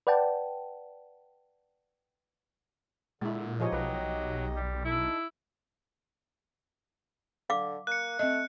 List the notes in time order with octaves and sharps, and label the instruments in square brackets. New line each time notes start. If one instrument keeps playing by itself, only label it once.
[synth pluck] B4 D5 F#5 G5 A5
[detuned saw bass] A#2 [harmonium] D3 [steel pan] G#3 E4
[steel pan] F3 G#4 C#5 [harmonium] D#4 G4 D#5
[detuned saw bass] B1 [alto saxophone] F#3 [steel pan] B4
[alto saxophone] G3
[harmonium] D#4 A4 [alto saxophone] E4
[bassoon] D3 [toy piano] F5 D6
[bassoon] A#3 [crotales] F#6 C#7
[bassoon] A3 [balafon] C4 D#5